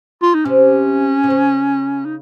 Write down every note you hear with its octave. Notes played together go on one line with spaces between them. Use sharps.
F4
D#4
C3 C#4
C3
C#3
D#4